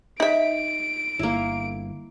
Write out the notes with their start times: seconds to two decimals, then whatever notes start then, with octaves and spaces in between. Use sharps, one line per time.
0.20 D#4 E5 D7
1.19 G1 A#3 E4